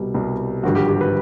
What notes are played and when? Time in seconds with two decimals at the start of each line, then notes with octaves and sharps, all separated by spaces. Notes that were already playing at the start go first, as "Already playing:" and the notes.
Already playing: C2 B2 G3
0.15 C2 B2 G3
0.63 G#1 G2 D3 F3 F#4
0.75 G4
0.89 G4
1.01 B4